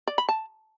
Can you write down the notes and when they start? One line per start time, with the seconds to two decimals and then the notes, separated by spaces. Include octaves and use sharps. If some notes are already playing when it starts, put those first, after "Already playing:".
0.07 D5
0.18 B5
0.29 A5